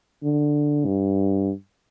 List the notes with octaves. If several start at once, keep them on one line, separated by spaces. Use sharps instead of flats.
D3
G2